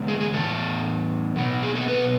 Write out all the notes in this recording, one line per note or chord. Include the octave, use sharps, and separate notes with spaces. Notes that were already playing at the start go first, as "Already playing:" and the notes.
Already playing: C#3 G#3 B3
G#4
G#4
A2 E3 B3 A4
B2 F#3 B3
G#4
A4
B4